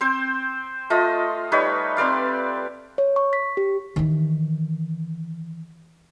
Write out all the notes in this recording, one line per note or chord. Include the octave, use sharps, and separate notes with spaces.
C4 C5 G5
A3 F4 D#5
G3 D#4 B4 C#5
C4 B4 D5 F5
C#5
C#6
B6
G4
D#3 E3